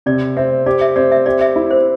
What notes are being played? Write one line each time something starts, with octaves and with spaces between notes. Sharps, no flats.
C3 D5
C4 E5
G4 D5
E5
C4 D5
E5
G4 D5
E5
E4
C5